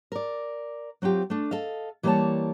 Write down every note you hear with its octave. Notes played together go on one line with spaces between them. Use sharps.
A#4 D5
F#3 C4 F4 G4
A3 D4
A4 D#5 F5
E3 G3 A#3 B4 C#5 A5